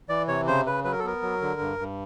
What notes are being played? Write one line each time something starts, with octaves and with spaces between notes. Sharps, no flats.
E3 D5
C3 C#5
C#3 C5
C#3 B4
F#3 B4
A#4
A4
B3 A#4
F#3
D3
G2
G2